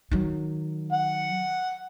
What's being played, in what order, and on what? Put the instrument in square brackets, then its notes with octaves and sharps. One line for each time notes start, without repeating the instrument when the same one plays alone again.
[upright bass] D#3 F#3
[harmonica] F#5